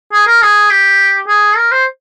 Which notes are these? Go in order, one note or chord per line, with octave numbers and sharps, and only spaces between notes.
G#4
A#4
G#4
G4
G#4
A#4
C5